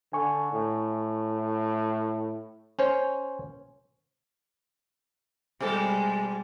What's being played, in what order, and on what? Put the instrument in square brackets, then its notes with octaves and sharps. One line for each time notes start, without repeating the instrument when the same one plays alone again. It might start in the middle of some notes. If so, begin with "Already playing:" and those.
[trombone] D3 [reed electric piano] G#5 C#6
[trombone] A2
[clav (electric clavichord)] C#4 C5 C#5
[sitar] B2 G4 A4 [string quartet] G3 G#3